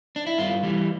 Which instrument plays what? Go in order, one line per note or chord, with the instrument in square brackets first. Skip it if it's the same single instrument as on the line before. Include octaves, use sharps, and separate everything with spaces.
[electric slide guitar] D4
E4
G2 F4
E3 G3